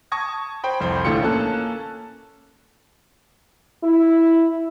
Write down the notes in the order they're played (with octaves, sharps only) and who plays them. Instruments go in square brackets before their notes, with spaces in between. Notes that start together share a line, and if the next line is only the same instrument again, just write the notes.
[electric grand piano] A5 C#6 D#6 G#6 A#6
C5 G5 B5
C2 F2 C5
A1 A2 D3 F4 C#7
A#3 C#4 A4 A5 F#6
[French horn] E4